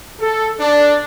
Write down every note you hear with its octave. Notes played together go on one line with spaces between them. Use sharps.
A4
D4